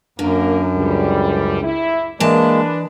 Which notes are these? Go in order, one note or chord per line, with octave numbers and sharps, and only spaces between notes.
F#2 D3 A#3 A#4
C#2 G3
E4
E3 G#3 A#3 D4 B4 A5